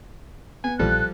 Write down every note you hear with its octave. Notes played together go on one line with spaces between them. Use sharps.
B3 G#5
A#1 F3 G3 A4 F#6